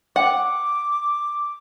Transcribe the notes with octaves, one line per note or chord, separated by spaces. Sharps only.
F#5 D6